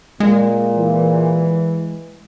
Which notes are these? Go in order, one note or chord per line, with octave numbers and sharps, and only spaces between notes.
A#2 G#3
E3